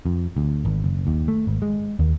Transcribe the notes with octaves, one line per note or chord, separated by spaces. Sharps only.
F2
D2
G#1
F#1
D#2
A3
G#1
G#3
D#2